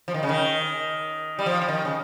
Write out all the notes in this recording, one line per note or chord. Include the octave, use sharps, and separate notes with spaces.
F3
D#3
C#3
D#3
G3
F3
F3
D#3
C#3